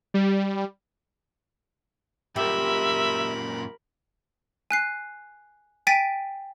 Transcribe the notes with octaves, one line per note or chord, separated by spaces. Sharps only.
G3
F#2 A#2 G4 A#4 E5 B5
G#5 F#6 C7
G5 G#5 A6 B6 D7 D#7